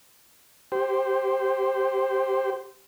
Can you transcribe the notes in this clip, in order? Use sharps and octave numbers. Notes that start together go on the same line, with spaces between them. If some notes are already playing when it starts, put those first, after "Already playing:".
G4 C5